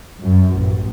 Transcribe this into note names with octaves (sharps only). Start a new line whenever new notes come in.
F#2
A1